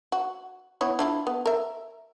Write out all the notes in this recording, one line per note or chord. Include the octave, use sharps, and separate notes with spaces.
F#4
B3 E4 C#5
D4 E4 F4
B3
A#4 E5